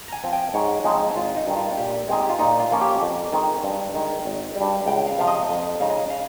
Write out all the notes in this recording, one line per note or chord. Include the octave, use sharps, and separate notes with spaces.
A#5
G#5
F3 C4
G5
G#2 C#5
F3 G#3 C4 D#4
G#1 F4
D#4
G2 D#3
F4
A#2 G4
G#3 C4 D#4 G#4
G4
F4
A#2 D#4
F4
F3 A#3 C#4
G4
F2
D#3 G#3 C4 D#4
G2
D#3 G#3
G#1
G3
G2
C#2 G5
F5
C3 F3 F5
D#5
F2
C#3 G#3 D#4 F5
D#5
F5